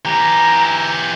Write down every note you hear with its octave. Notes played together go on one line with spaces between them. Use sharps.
E3 G4 A#5